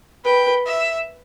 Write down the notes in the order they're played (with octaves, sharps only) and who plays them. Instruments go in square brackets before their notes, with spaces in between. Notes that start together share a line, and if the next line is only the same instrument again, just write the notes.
[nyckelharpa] B4 [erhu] G5
[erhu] E5